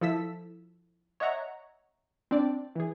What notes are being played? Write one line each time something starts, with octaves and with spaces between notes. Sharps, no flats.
F3 E4 A4 E6 B6
C#5 D#5 E5 F#5 A#5 C#6
C4 D4 D5
E3 G#4